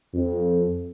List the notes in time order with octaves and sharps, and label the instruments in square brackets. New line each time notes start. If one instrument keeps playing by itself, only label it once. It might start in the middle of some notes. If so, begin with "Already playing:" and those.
[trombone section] F2